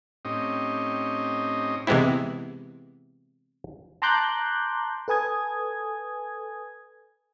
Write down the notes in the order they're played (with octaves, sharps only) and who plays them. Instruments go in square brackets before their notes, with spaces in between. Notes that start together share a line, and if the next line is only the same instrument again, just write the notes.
[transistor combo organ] A2 C4 C#4 D#4 G4 D#5
[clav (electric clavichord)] C3 E3 G#3 B3 C4 E4
[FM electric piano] A5 A#5 C6 D6 F#6 G6
A4 B4 G#5 D#6 G#6